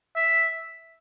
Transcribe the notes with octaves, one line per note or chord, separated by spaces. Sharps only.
E5